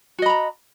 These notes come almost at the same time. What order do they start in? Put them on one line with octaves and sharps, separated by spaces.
F#4 D#5 B5 A#5